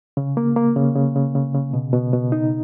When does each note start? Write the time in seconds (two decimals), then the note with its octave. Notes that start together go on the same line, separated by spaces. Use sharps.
0.17 C#3
0.37 A#3
0.56 A#3
0.76 C#3
0.95 C#3
1.16 C#3
1.35 C#3
1.54 C#3
1.74 B2
1.93 B2
2.13 B2
2.32 D#4